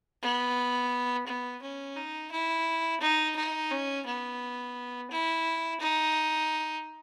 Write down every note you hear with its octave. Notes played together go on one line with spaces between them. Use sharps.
B3
B3
C#4
D#4
E4
D#4
D#4
C#4
B3
E4
D#4